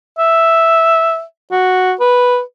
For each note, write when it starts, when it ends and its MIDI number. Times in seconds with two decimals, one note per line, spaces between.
0.19 1.23 76
1.51 1.93 66
2.00 2.41 71